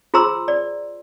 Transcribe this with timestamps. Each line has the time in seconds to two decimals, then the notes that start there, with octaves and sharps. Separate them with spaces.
0.14 F4 G#4 C5 A#5 C6 E6
0.48 D5